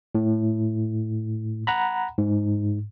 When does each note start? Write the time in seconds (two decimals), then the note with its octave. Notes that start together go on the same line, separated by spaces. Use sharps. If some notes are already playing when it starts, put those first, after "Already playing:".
0.15 A2
1.67 F#5 A#5 B5
2.18 G#2